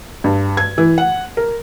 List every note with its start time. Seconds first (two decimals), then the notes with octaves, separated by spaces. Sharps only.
0.24 G2
0.57 G#6
0.78 E3
0.98 F#5
1.37 A#4